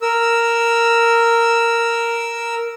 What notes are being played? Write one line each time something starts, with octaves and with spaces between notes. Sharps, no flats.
A#4 E6